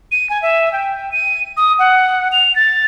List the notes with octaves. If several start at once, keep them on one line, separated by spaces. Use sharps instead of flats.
D#7
G#5
E5
G5
D#7
D#6
F#5
F7
A6